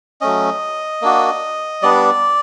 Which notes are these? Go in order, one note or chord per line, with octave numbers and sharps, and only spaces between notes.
F#3 A3 C#4 D#5
A#3 D4 F#4
G3 B3 D4 D5